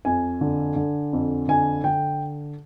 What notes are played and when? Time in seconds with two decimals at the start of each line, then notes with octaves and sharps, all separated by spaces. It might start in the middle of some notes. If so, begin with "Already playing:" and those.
0.05 F2 G#5
0.41 D3
0.76 D3
1.13 F2
1.48 D3 G#5
1.84 D3 G5